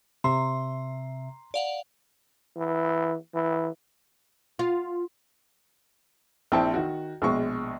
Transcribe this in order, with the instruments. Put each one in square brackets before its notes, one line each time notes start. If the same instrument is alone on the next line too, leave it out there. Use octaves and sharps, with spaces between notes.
[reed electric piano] C3 E5 [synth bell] A#5 [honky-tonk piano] C6
[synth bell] D5 F5 F#5
[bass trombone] E3
E3
[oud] F4
[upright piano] A#1 C4 E4 G5 A5
D#3 F#4
A#1 B2 G#3 C#6